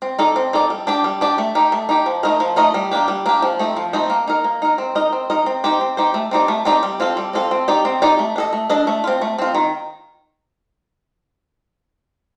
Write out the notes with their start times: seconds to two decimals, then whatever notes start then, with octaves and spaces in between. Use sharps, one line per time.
0.02 C4
0.19 D#4 A4 D5
0.36 C4
0.53 D#4 A4 D5
0.70 G3
0.87 D4 G4 D5
1.04 G3
1.21 D4 G4 D5
1.38 A3
1.55 D#4 G4
1.72 A3
1.89 D#4 G4
2.06 F3
2.23 A3 D#4 A#4 D#5
2.40 F3
2.56 A3 D#4 A#4 D#5
2.74 G3
2.91 A#3 D4 G4
3.08 G3
3.26 A#3 D4 G4
3.42 F3
3.59 A3 C4 D#4
3.77 F3
3.93 A3 C4 D#4
4.10 A#3
4.28 D#4 A#4
4.44 A#3
4.62 D#4 A#4
4.78 C4
4.95 D#4 A#4 D#5
5.13 C4
5.30 D#4 A#4 D#5
5.46 C4
5.64 D#4 G4 C5
5.81 C4
5.97 D#4 G4 C5
6.14 A3
6.31 C4 D#4 G4 D5
6.48 A3
6.65 C4 D#4 G4 D5
6.83 G3
7.00 C4 F4 A4
7.17 G3
7.33 C4 F4 A4
7.51 C4
7.68 D#4 G4 D5
7.85 C4
8.02 D#4 G4 D5
8.19 A3
8.36 D4 A4 D#5
8.53 A3
8.70 D4 A4 D#5
8.87 A3
9.04 C4 F4
9.21 A3
9.38 C4 F4
9.55 D#3